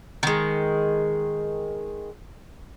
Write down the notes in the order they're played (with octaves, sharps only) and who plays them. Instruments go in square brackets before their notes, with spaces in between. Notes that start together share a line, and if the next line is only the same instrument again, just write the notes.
[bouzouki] D#3 G#3